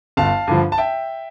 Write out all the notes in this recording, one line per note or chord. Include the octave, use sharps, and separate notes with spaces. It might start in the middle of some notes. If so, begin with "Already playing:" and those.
G1 F5 A5
G2 D3 F3
A5
E5 G5